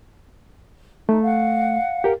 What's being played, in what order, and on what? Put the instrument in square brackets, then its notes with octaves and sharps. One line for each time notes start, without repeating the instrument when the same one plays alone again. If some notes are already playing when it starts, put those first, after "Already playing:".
[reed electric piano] A3 [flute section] D#4
[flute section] F5 F#5
[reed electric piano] G4 A#4